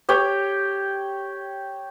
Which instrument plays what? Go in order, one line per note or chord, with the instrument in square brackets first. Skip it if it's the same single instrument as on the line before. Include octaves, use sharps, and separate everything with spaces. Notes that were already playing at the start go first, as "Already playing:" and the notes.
[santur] G4 C#5 G5